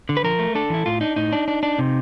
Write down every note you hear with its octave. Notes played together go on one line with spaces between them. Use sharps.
D3
B4
F3 A#4
A3
D4 A4
E3 E4
A2 F4
D4 D#4
A2 D#4
D4
D4
D4
C3